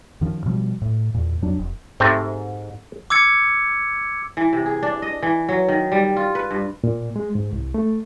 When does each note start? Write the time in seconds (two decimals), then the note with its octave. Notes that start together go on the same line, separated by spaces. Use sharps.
0.21 F#2 D#3 F3
0.46 B2 F3 G3
0.82 A2
1.14 E2 A#2
1.42 F2 F#3 D4
1.59 F1
2.00 G#2 C3 A3 C4
3.10 D6 E6 G#6 C#7
4.37 E3
4.53 C3
4.66 G#4
4.83 D4
5.02 D#5
5.22 E3
5.49 F#3
5.68 D#3
5.92 G3
6.16 F4
6.35 B4
6.51 G2
6.84 A#2
7.16 G#3
7.35 G#2
7.53 C2
7.74 A3